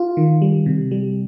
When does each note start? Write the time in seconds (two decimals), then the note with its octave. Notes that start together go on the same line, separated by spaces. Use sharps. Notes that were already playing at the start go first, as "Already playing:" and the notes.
Already playing: F4
0.17 D#3
0.42 G3
0.66 C3
0.91 G3